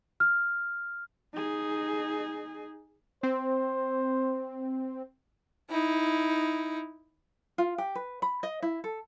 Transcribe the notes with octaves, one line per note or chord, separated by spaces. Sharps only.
F6
D#4 G#4
C4 C5
D#4 E4
F4
G4
B4
B5
D#5
E4
A4